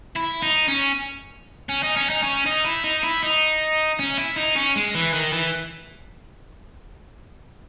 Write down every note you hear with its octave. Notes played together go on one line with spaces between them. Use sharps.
E4
D#4
C#4
C#4
D#4
C#4
D#4
C#4
D#4
E4
D#4
E4
D#4
C#4
E4
D#4
C#4
G#3
E3
D#3
E3